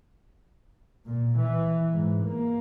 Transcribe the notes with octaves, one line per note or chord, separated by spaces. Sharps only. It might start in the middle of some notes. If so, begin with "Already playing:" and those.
A#2
E3
G#2
A#3